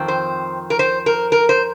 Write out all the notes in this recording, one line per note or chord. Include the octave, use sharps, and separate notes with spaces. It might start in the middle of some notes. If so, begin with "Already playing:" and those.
Already playing: F2 D#3 C4
C5
A#4
C5
A#4
A#4
C5